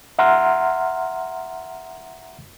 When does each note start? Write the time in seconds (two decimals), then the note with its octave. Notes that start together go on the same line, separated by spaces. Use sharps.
0.19 E5 F#5 A#5 C6 F6